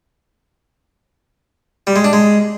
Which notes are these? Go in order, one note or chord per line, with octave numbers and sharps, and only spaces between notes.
G3
G#3
D4
G#3